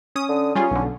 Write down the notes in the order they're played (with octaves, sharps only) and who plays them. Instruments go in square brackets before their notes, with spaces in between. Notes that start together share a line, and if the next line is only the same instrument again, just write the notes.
[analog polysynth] C#4 D#6
[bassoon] D3
[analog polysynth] G3 F4 G#4 [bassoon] C#4
[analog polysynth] B1 D3